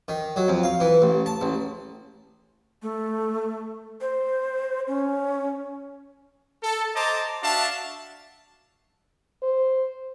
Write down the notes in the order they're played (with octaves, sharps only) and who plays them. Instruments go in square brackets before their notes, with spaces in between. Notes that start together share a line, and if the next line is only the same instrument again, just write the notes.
[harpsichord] D#3
F#3
F2
F5
E3
A1
A5
A1
[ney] A3
C5
C#4
[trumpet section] A4
C5 D#5 A5 A#5 D6
D4 F#4 E5 F5 A5
[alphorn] C5